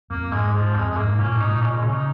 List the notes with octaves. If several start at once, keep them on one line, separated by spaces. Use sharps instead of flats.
F2 A#3
G#2 G#3
G#2 F3
F2 G#3
G#3
G#2 A#3
A#2 C#4
G#2
D#4
A#2
A#2 C#4
G#3
C#3 C#4
D#4